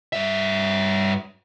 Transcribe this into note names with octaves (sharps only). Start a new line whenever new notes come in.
G2 E5